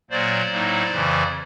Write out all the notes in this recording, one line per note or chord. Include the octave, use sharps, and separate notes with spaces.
A#2 F#3 A#3 C5 D5
A2 F#3 A#3 D#4
F2 C#3 E3